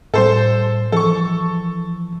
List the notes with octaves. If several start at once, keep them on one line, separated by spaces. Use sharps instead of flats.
A2 G3 A4 C5 C6
E3 F3 A4 C#6